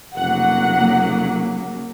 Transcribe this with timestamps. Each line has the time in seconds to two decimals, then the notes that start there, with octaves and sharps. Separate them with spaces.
0.16 F1 C#3 F#3 A#3 F#5